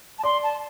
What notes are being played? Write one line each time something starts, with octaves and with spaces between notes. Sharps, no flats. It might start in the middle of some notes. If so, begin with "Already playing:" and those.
A5
D5 C6
A5